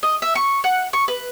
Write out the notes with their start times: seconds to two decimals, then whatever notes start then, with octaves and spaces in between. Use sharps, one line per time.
0.03 D#5
0.22 E5
0.35 C#6
0.64 F#5
0.93 C#6
1.08 B4